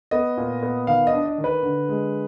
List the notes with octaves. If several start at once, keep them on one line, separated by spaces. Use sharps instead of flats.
B3 D#5
A#2
B3
D#3 F5
D#5
D4
D#5
D#3
B4
D3
G#3